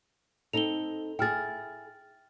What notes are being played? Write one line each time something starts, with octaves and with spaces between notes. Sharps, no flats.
C4 D#4 A4 F7 G7
E4 G#4 G5 F6 A6